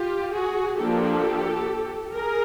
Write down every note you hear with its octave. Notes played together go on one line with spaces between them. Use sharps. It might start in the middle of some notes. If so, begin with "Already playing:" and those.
Already playing: F4 G4
F#4 G#4
F3 A#3 D4 G4 A4
G#4 A#4